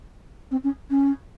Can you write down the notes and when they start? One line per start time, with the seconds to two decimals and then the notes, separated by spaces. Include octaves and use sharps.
0.51 C4
0.63 C#4
0.90 C#4